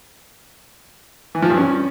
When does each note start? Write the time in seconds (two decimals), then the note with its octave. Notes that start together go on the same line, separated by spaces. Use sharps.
1.35 E3
1.42 F3
1.50 G2
1.58 C#4